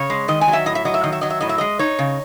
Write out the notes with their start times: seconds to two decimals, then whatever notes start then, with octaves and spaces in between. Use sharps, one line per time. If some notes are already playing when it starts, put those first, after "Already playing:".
Already playing: C#3 C#5
0.10 G#3
0.28 D#3 D#5
0.41 G#5
0.48 F#3
0.53 E5
0.66 A2 D#5
0.75 E5
0.85 F#3 D#5
0.94 E5
1.03 D#3 D#5
1.12 E5
1.21 F#3 D#5
1.30 E5
1.40 A2 D#5
1.49 E5
1.58 G#3 D#5
1.79 D#4 C#5
1.99 C#3